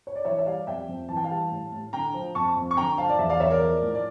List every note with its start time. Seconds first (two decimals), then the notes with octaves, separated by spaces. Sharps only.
0.07 C#5
0.16 D5
0.25 E3 C#5 E5
0.38 E5
0.46 G3 D5 F5
0.67 F2 E5 G5
0.89 F2
1.09 E3 A5
1.17 G5
1.24 F5 A5
1.31 G3
1.51 A2
1.72 A2
1.93 D3 G5 A#5
2.14 F3
2.35 F2 A5 C#6
2.56 F2
2.71 C#6
2.77 D3 G5 A#5
2.98 F3 F5 A5
3.09 D5
3.19 E2 E5
3.29 D5 F5
3.40 E2 C#5 E5
3.50 A#4 D5
3.61 F3
3.82 A2
3.95 D5